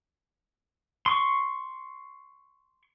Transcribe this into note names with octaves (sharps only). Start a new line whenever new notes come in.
C6 C#6